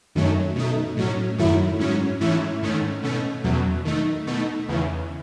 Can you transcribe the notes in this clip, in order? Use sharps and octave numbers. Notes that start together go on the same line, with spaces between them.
F#2 D#3 F#3 A3 C#4
B2 A3 D#4
A2 F#3 C#4
F#2 D#3 F#3 A3 E4
G#2 F#3 C#4
G#2 E3 A3 C#4 E4
G#2 D#3 A3 C#4
B2 A3 C#4
E2 B2 F#3
D#3 A3 D#4
B2 A3 D#4
E2 C#3 E3